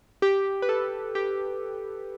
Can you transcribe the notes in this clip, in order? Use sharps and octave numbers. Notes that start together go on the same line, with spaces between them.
G4
B4
A4
G4